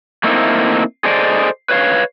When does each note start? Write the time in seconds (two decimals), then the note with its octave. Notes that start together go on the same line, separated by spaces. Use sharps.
0.24 A3 A#3 C4 D#4 E4
1.04 G#4 A4 C5 D5 D#5
1.69 B4 C#5 F5